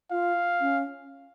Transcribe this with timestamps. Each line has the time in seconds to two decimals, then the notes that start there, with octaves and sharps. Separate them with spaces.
0.11 F4 F5
0.61 C#4